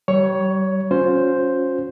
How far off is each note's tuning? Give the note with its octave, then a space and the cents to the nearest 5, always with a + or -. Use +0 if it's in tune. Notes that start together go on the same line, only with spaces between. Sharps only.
G3 -35 C#5 +10
C#4 +0 F4 +45 C5 +0